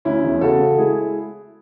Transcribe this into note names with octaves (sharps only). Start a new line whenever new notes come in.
D2 C#4 E4
E1
C#3 F#4 A4
C#3
G#3 E4 G#4